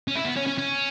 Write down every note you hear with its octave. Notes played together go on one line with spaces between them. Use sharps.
C#4
E4
B3
C#4
C#4
C#4